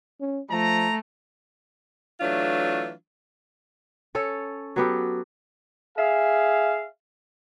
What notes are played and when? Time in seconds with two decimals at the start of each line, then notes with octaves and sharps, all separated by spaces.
0.21 C#4
0.51 F3 A3 A#5
2.20 E3 F#3 A3 D4 F4
4.15 C#4 A4 C#5
4.76 F#3 B3 G4 A4
5.97 G#4 E5 F5